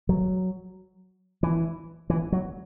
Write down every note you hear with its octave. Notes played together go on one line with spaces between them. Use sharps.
F#3
E3
E3
F#3